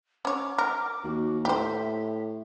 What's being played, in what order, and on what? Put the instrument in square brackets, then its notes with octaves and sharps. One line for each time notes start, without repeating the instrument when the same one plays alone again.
[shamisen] C#4 C#5 [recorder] D6
[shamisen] A#4
[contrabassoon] D#2 [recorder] F#4
[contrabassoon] A2 [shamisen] G4 C5 [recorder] E5